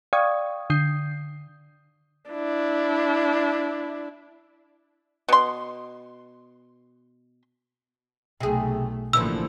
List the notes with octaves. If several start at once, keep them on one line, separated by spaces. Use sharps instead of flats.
D5 F5 G5 C#6 D#6 G#6
D3 D#6 G6 C7
D4 E4
B2 C6
B1 C3 A3 G#4
A1 D3 E3 F3 A#3 E6